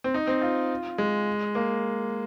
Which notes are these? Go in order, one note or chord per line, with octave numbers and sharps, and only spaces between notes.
C4
D#4
C4
F4
G#3
A#3